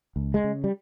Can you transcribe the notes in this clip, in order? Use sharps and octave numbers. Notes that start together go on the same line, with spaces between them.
C#2
G#3
C#3
G3